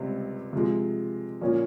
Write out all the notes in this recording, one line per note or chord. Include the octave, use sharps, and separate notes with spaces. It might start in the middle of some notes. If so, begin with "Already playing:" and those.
Already playing: C#2 C3 G3 C4
C3 F3 G#3
A#2 F3 A#3 C#4